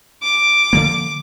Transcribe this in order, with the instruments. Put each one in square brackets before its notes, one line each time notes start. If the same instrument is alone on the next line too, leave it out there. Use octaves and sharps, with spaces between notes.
[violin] D6
[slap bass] D3 F3 A#3